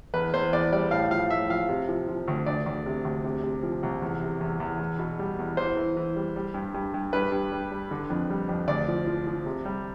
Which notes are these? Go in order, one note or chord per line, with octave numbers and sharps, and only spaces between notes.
E2 B4
E2 C5
E2 D5
G3 D5
A2 F5
F3 F5
A2 E5
F3 F5
C3
F3
F3
D2
D2 D5
D2
C3
D2
C3
C3
F3
C2
E2
C3
E2
E2
E2
B2
G3
E2
E3 C5
E3
E3
G3
G3
G2
G2
G2
G2 B4
G2
G3
G3
D3
F2
G3
F2
D2 D5
F3
F3
F3
C3
G3